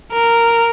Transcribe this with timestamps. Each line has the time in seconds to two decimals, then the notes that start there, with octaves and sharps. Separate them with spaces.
0.13 A#4